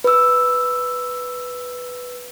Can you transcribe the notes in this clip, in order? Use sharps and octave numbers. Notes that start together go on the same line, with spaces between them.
B4 E6